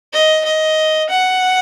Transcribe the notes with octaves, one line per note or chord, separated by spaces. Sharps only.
D#5
D#5
F#5